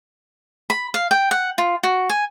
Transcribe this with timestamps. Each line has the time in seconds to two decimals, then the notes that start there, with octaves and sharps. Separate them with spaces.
0.70 B5
0.94 F5
1.11 G5
1.31 F#5
1.58 F4
1.83 F#4
2.09 G#5